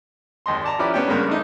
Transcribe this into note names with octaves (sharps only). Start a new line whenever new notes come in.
G#1 D#2 D#5 C6
D5 A5 A#5
F3 C#4 E4 G4 B4 D5
B3 C#4 D4 G5
G2 C#3 G#3 A#3 B3
A3 D4 D#4